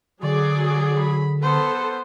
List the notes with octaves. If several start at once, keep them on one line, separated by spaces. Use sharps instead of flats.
D3 F#3 G#4 D5 D6
B5
B3 A4 C5